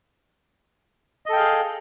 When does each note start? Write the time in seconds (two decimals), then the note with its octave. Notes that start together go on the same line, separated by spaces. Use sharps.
1.26 D#5
1.29 A4
1.33 G5
1.36 F5
1.40 G#4